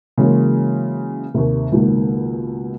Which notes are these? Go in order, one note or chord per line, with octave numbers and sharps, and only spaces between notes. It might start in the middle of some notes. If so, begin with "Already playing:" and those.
C#3 E3 F#3 G#3 A#3 C#4
D#2 C3
C#2 G#2 B2 D#3 A#3